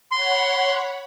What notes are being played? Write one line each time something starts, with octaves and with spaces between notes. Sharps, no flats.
C#5 F#5 B5 C6